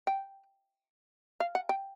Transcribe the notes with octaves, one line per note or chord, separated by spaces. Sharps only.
G5
F5
F#5
G5